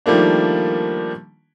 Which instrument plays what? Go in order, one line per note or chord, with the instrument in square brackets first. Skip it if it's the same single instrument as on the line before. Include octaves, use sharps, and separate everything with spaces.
[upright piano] D#3 F3 G3 A3 A#3 D4